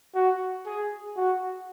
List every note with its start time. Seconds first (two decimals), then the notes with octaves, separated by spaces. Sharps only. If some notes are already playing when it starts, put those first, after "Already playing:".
0.15 F#4
0.66 G#4
1.17 F#4